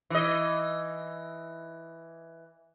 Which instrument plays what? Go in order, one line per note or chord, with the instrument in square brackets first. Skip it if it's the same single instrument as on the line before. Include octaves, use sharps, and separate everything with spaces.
[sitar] E3 D#5